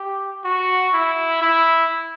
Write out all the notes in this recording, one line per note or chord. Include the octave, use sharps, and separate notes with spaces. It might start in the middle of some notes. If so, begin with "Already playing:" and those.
Already playing: G4
F#4
E4
E4